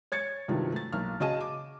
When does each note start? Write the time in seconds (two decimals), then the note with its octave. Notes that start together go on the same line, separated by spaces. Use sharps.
0.12 C#5 G#6 A6 C#7
0.48 G2 C3 D#3 F3 F#3
0.72 A3 A6
0.93 B1 A#3 F6
1.20 C#3 F#4 G#4 D#5 A5 D#7
1.41 D6